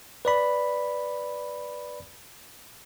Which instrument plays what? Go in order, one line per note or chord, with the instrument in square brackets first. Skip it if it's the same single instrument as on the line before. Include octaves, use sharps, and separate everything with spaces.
[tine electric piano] B4 D5 B5